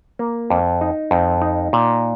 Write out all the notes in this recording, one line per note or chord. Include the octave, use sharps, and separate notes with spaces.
A#3
F2
D#4
F2
D#4
A#2